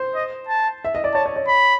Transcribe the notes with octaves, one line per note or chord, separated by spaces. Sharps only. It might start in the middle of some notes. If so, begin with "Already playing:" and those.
Already playing: C5
D#5
A5
E5
D#5
D5
C#5 A5
C#5
C#5
B5